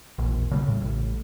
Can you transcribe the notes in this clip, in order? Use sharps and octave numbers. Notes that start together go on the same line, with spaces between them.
E1 A#1
C#3 F3 G3
A2
A1